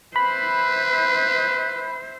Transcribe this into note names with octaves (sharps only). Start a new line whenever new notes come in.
B4 C5 E5 B5